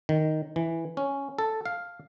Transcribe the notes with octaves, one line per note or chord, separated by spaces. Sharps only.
D#3
E3
C#4
A4
F5